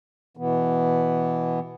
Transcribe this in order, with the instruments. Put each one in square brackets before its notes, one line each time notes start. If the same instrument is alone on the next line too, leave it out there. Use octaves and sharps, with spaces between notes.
[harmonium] B2 E3 B3